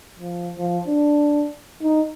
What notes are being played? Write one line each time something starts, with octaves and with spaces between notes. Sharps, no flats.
F3
F3
D4
D#4